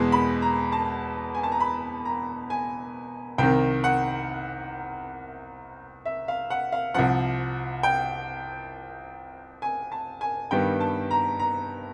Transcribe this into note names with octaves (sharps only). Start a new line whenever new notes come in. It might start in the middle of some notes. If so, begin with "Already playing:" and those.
Already playing: E2 B2 G#3
B5
A#5
A5
G#5
A5
A#5
B5
A#5
G#5
C2 C3 D#3 G5
F#5
E5
F5
F#5
F5
C2 C3 F3 F#5
G5
G#5
A5
G#5
G2 D#3 G3 B3 G5
A5
A#5
A#5